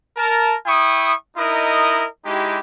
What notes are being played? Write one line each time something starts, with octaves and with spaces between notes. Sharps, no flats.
A#4 A5
E4 G5 C#6 D#6
D#4 E4 A#4 D#5 D#6
G#3 D#4 E4 G4